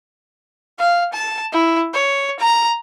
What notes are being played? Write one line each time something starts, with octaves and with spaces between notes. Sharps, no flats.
F5
A5
E4
C#5
A#5